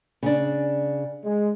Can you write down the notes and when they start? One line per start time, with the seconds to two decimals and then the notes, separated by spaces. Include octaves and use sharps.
0.23 C#3 D4
1.24 G#3